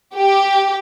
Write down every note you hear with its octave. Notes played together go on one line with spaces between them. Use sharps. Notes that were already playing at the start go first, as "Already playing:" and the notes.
G4